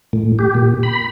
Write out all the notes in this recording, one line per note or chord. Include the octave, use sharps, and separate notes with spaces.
A2
G4
A#2
B5